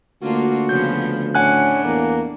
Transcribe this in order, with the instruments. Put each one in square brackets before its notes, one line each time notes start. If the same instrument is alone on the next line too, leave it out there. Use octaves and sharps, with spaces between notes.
[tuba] D2 [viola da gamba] A#3 D4 F4 [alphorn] F#4
[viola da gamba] C#3 F3 B3 [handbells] G6
[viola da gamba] A2 D4 [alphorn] C#4 [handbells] F#5 G#5 F#6
[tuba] E2 [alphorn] A#3